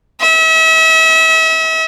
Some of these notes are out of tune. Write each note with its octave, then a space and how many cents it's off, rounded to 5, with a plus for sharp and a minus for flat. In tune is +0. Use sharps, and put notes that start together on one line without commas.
E5 -40